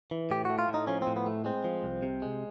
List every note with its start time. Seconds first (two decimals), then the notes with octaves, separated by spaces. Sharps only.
0.11 E3
0.31 A2 G4
0.45 A3 F#4
0.59 F4
0.69 A2
0.74 D#4
0.87 F3 C#4
1.02 C4
1.07 A2
1.16 B3
1.26 A3
1.45 G#3 C4
1.64 F3
1.83 C2
2.03 C3
2.22 G#3